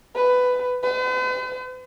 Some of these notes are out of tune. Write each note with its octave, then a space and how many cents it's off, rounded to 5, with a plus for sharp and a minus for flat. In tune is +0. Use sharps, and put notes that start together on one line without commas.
B4 +15
B4 +45